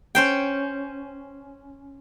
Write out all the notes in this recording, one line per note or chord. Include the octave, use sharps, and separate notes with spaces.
C#4 C5 G5